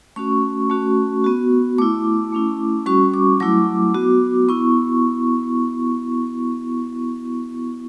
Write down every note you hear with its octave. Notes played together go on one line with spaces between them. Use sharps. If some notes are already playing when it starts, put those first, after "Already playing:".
A3 C#4 F#4 C#6
A3 C#4 F#4
B3 F#4
A3 E4 D6
A3 C#4 E4
G3 C#4 F#4 C#6
D6
F#3 A3 E4 D6
B3 F#4
B3 E4 C#6